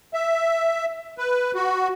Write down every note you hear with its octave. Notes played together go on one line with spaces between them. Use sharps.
E5
B4
F#4